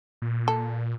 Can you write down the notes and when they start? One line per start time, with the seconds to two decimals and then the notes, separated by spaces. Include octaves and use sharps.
0.22 A#2
0.48 A4